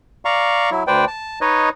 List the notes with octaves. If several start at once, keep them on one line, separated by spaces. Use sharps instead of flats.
D5 F5 A#5 C#6
F#3 E4
D2 B4 C5 D5 G5
A5
D#4 B4 C#5 D#5